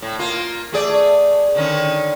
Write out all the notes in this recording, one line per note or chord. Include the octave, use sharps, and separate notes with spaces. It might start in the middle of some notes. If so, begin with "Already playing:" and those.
A2
A#3 F4
A3 G#4 D5
D3 D#3 C#4